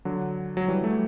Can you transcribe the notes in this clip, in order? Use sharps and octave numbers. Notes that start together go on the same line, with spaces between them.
D3 F#3
F#3
E3 G3
F#3 A3